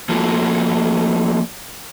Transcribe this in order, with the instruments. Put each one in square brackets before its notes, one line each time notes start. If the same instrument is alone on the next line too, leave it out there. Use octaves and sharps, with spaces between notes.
[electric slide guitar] F3 A3 A#3 F4 F#4